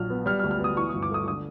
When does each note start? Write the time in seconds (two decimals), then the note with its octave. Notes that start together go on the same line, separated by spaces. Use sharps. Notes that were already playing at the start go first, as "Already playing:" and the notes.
Already playing: A#1 F#3 F6
0.10 B3
0.26 G3 F6
0.39 F6
0.44 D2
0.51 F6
0.60 B3 D#6
0.76 E3 C#6
0.89 G1 D#6
1.03 D6
1.11 A3 D#6
1.28 D3 D#6